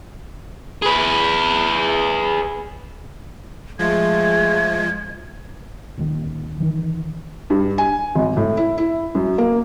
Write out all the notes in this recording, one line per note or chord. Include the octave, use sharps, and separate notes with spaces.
G#4 B4
F3 G#3 A3 F4 G#4 G#6
D1 D#2 D#3
D#3 E3
G2
G#5
G#1
A2
E4
E4
F#2
A#3